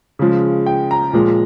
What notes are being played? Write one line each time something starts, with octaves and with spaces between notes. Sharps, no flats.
C#3 F3 G#3
G5
A#5
A#2 F3 G#3